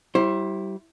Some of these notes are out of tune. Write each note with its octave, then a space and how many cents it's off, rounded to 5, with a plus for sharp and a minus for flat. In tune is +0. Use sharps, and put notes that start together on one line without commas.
G3 -25 E4 +0 C5 +25